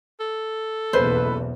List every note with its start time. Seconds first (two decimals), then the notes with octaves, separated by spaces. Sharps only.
0.20 A4
0.93 F#1 B1 E2 B4 C5